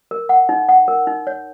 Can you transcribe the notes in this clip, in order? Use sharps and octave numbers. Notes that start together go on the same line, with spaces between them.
A#4
F#5
D#4
F#5
A#4
D#4
C#5